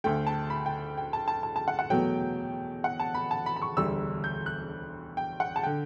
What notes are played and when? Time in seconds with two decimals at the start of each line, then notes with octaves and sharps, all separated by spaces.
0.04 D2 D3 A3 G5
0.27 A5
0.50 B5
0.66 G5
0.97 G5
1.13 A5
1.28 A5
1.43 A5
1.56 A5
1.68 F#5
1.79 F#5
1.90 E2 B2 F#3 A3 G5
2.84 F#5
3.00 A5
3.14 B5
3.31 A5
3.46 B5
3.56 B5
3.62 C#6
3.77 E1 D2 D3 G3 E6
4.24 G6
4.46 F#6
5.17 G5
5.40 F#5
5.56 A5
5.63 D3 G5